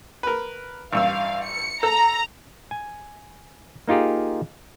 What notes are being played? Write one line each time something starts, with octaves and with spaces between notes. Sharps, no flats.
A#4 B4
A1 G2 F5 E6
C#7
A4 A#5
G#5
A#3 D#4 F4 G4 G#4